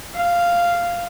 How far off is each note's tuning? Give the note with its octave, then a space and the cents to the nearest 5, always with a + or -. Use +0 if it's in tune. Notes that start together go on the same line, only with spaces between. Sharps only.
F5 -5